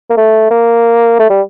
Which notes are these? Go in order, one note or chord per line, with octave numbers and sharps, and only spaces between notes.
A#3
A3
A#3
A3
G3